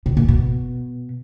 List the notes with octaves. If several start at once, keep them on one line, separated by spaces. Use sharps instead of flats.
B2
A#2
B2